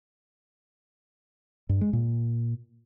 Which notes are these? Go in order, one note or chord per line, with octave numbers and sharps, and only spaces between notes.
G2
G#3
A#2